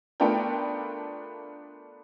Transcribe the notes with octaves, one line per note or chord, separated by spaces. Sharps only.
A3 B3 D4 F4 A#4 G5